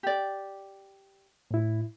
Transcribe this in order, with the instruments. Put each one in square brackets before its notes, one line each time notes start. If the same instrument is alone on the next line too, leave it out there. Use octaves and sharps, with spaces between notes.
[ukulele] G4 D5
[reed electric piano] A2 E4